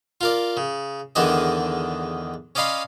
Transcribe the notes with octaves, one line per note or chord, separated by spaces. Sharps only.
F4 A#4 D5
C#3
E2 D3 D#3 D4 G#4 D#5
C#4 D5 D#5 F5 B5 C6